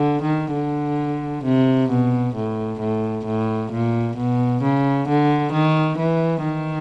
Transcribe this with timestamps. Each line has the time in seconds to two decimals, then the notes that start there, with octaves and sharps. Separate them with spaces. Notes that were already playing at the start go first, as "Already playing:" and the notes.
Already playing: D3
0.22 D#3
0.53 D3
1.44 C3
1.90 B2
2.36 A2
2.80 A2
3.26 A2
3.72 A#2
4.17 B2
4.62 C#3
5.08 D3
5.53 D#3
5.98 E3
6.44 D#3